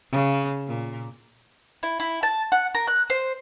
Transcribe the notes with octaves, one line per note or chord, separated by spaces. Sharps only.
C#3
A#2
E4
E4
A5
F#5
A#4
F#6
C5